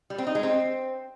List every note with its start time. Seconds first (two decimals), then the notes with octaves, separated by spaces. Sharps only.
0.10 G3
0.18 C4
0.27 D#4
0.35 G#3
0.43 C4